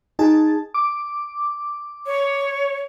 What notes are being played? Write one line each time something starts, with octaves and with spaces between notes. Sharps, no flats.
D#4 G#4 A5
D6
C#5